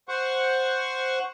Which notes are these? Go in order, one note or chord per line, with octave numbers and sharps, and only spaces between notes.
C5 F#5 C#6